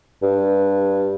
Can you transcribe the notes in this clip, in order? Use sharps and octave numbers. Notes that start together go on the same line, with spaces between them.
G2